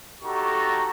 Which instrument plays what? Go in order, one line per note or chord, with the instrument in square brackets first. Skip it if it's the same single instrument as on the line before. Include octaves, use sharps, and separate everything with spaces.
[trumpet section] D#4 F#4 G4 A4 A#5 C#6